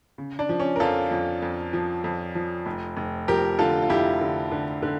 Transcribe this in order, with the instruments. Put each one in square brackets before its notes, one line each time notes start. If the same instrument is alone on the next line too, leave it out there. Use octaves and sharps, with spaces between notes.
[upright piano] C#3
D4
F3
C#4
A#4
F2 F4 A4
F2
F2
F3
F2
F3
F1
F1
F3 G4 A#4
D3 F4 A4
F4
F1 E4 G4
D3
D3
D3